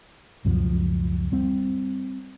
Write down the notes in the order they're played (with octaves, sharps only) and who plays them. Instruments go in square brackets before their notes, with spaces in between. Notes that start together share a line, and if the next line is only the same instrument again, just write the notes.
[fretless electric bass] C#2 F#2 B2 F3
G3 C4